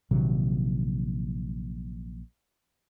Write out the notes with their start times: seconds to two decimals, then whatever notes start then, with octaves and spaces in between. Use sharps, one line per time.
0.11 A#1 C3 D#3 F#3